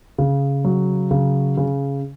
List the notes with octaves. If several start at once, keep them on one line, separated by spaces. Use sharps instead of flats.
C#3
F#3
C#3
C#3